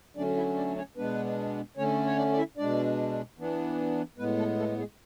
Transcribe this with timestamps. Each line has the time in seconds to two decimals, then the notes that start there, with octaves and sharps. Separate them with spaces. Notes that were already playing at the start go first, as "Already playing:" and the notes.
0.17 D3 F#3 A3 C#4 D4 D5
0.37 E4 E5
0.56 D4 D5
0.77 C#4 C#5
0.97 B2 G#3 B3 D4 B4
1.77 D3 A3 C#4 C#5
2.06 C#5
2.17 D4 D5
2.32 D5
2.37 E4 E5
2.57 B2 G#3 D4 D5
3.38 E3 B3 D4
4.18 A2 G#3 B3 B4
4.38 A3 A4
4.58 A3 A4
4.78 G#3 G#4